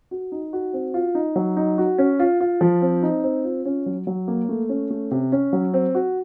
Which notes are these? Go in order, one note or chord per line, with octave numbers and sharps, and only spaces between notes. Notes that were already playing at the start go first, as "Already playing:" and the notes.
F#4
D#4
F#4
C4
F4
D#4
F#3
D#4
F#4
C#4
F4
F4
F3
C4
D#4
C4
F4
C#4
F#3
F#3
A#3
A3
C#4
A3
C3
C#4
F#3
C4
F#4